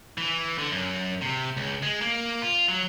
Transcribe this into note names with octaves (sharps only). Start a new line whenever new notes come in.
E3
D3
F#2
C3
C#2
G#3
A#3
F4
F#3